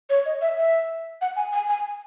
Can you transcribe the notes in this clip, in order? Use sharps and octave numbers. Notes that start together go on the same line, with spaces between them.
C#5
D#5
E5
E5
F#5
G#5
G#5
G#5